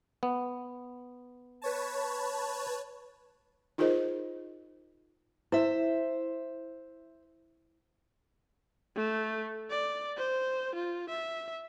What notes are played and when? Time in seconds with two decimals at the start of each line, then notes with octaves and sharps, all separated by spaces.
0.23 B3
1.62 B4 C#5 A5
3.78 D#4 F4 G#4 A#4 C5 D#5
5.52 E4 C5 E5
8.96 A3
9.70 D5
10.17 C5
10.75 F4
11.09 E5